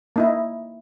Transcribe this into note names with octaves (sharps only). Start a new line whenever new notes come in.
A#3 D#4 E4